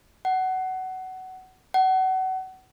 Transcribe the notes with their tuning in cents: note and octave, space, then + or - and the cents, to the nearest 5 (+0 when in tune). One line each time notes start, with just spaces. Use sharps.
F#5 +20
F#5 +30